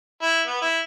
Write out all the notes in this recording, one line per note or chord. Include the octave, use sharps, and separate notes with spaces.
E4
B3
E4